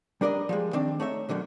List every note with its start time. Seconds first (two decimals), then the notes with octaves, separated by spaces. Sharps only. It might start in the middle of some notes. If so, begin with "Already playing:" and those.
0.21 G3 D4 A#4 D5 D#5
0.49 F3 G3 G#3
0.73 D#3 C4 D4
1.00 A3 D#4 C#5 E5
1.29 B2 D3 D#3 F#3